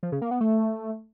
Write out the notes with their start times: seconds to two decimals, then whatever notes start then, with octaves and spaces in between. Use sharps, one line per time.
0.03 F3
0.12 C#3
0.22 A#3
0.31 B3
0.41 A3